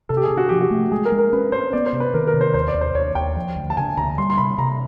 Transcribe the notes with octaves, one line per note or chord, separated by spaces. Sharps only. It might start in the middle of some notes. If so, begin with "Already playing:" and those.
C3 A4
G4
G#4
C3
F#4
F3 G4
F#4
A3
G#3 G#4
A#4
G#3
A#4
C#4 B4
C#4 C5
B3 D5
C5
C3
B4
D#3 A#4
A#4
C3
C5
D#2 C5
D5
D#2
C5
D#2 C#5
D#2 G5
F3
D2
A5
C#3 G#5
D2 A#5
G3 C6
C6
C3 B5
C3 A#5